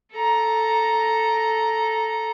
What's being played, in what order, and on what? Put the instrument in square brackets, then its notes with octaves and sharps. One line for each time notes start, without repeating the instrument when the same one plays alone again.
[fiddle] A4 A#5